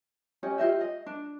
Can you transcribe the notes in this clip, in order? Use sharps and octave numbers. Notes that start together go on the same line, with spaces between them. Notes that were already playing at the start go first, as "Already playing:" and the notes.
C#4 G4 D#5
F4 G4 D#5 E5
D#5
D4